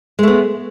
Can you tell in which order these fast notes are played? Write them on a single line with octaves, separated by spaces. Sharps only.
G#3 A3 B3